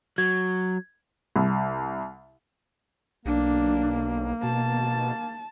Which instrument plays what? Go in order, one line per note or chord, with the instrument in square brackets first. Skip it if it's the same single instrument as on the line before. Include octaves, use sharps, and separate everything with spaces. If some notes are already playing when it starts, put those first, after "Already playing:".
[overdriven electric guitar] F#3 [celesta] G#6
[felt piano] C2
[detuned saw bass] B1 [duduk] A#3 [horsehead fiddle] D4
[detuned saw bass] B2 [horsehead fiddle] A5